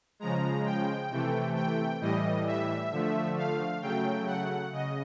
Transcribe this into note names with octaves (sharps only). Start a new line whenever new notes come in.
C#3 F3 G#3 A#5
G5
C3 E3 A3
G5
A2 E3 G3 D#5
E5
D3 F3 A3
F5
C#3 F#3 A3 G5
F#5
C#3 D#5